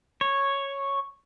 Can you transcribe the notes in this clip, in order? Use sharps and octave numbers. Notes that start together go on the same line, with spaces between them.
C#5